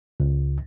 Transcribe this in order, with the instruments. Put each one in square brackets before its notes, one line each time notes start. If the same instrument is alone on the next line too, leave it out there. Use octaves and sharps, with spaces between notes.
[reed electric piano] C#2